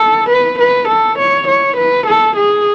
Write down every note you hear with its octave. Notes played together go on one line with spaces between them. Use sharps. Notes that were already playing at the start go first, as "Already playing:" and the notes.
Already playing: A4
B4
B4
A4
C#5
C#5
B4
A4
G#4